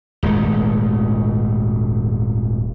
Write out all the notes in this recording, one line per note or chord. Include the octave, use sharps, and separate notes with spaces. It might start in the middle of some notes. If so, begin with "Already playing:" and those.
D#1 G#1 G#3 A3